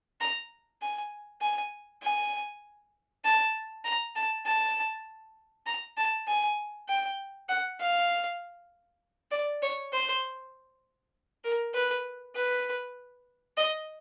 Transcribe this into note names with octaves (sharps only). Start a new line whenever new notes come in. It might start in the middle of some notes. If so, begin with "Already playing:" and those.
A#5
G#5
G#5
G#5
A5
A#5
A5
A5
A#5
A5
G#5
G5
F#5
F5
D5
C#5
C5
A#4
B4
B4
D#5